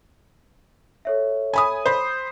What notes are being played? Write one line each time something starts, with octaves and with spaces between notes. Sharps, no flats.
A4 C#5 E5
G#5 B5 D#6
C5 B5